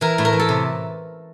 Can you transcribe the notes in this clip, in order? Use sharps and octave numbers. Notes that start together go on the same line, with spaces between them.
E3 A#4
A2
A#4
E3
A4
C3